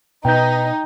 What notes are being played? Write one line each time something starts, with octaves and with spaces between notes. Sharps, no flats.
B2 D#4 B4 G5 A#5 G6